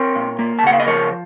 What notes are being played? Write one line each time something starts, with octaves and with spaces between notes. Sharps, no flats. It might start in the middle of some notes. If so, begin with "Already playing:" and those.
Already playing: C4 A#4 C#5
A#2
A#3
A5
C#3 F#5
F5
D#5
F3 A#4 C#5